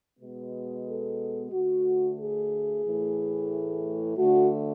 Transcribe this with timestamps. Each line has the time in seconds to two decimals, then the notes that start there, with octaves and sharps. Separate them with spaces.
0.18 B2 G#3 B3
0.85 A4
1.51 D2 D3 A3 F#4
2.18 G#4
2.84 A2 E3 A3
4.18 D2 D3 A3 F#4